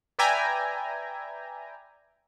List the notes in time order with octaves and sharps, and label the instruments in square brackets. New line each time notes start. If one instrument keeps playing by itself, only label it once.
[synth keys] B4 D5 E5 G5 G#5 A#5